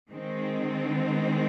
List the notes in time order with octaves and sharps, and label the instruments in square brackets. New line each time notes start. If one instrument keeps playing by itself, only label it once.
[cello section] D#3 G#3 C4